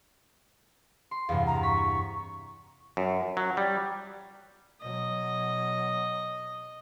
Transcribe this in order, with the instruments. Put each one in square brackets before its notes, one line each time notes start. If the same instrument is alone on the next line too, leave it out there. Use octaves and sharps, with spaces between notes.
[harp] C6
[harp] E2 G2 C3 [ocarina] F5
[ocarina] A#5
[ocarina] C#6 [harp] B6
[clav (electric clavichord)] F#2
F#3
G3
[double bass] B2 F#3 [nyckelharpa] D#5